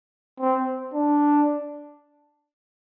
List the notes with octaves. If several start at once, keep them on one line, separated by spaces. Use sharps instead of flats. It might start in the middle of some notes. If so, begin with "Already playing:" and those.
C4
D4